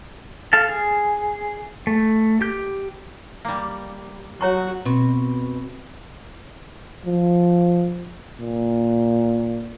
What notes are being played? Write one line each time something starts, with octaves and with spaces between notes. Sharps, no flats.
A4 F5 A5
G#4
A3
G4 G6
G3 A#3
F#3 F#4 C#5 A#5 C#6
B2 C4
F3
A#2